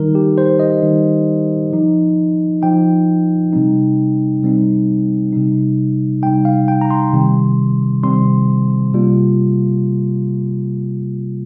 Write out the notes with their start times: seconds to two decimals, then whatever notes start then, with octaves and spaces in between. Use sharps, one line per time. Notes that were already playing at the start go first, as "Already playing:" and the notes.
Already playing: D#3 G3 D#4 A#4
0.15 G4
0.38 C5
0.60 D#5
0.82 D#3 G3 D#4
1.73 F3 D#4
2.62 F3 D#4 G5
3.53 C3 G3 C4 D#4
4.43 C3 G3 C4 D#4
5.33 C3 G3 D#4
6.22 C3 G3 D#4 G5
6.45 F5
6.68 G5
6.81 A#5
6.91 C6
7.13 C3 D#3 G3 C4
8.03 C3 D#3 G3 C4 C6
8.94 C3 G3 A#3 F4